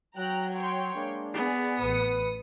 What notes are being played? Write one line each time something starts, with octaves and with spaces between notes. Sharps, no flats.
F#3 G5 A#5 F#6
C#5 G5 C6
G#3 A#3 D4
B3 G#4 D5
A1 B4 D#6 C#7